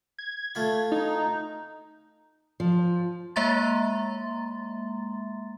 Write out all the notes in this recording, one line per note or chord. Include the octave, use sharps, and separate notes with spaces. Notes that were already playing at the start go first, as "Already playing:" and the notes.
G#6
A3 F4 B5
D#4
F3
G#3 A#3 E5 A#5 C6 A6